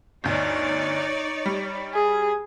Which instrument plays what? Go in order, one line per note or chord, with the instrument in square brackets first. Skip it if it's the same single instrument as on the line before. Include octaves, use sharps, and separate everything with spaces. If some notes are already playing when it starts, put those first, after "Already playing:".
[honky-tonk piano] G1 D2 [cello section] D#4 C#5 D5
[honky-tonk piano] G3
[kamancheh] G#4